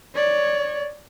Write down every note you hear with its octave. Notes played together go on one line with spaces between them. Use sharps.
C#5 D5